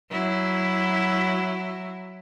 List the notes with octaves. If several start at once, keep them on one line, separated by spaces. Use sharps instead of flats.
F#3 E4